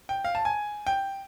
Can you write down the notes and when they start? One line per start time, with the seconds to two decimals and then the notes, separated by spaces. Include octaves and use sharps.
0.09 G5
0.24 F5
0.35 A5
0.45 G#5
0.87 G5